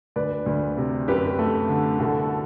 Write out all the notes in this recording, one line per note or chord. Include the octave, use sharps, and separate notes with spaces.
D2 B4 D5
D2
C3
F#2 G4 B4
A3
D3
C2 F#4 A4